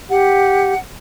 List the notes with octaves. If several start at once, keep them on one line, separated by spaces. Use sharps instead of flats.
G4 F#5